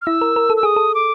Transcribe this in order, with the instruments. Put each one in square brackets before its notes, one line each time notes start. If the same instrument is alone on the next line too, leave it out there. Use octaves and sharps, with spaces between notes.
[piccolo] F6
[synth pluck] E4 [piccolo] E6
[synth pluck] A#4
A#4
A4
[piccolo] E6
[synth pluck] G#4 [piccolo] D#6
[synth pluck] A4
[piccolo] D6